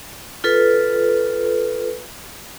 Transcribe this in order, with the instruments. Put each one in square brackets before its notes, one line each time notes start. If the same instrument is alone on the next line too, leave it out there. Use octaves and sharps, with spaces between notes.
[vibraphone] F4 A4 B4